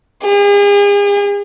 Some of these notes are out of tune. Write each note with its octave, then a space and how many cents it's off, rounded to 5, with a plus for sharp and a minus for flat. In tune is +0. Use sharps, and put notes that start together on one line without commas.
G#4 -40